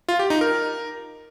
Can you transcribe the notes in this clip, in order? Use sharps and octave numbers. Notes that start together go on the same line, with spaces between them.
F4
G4
D#4
A#4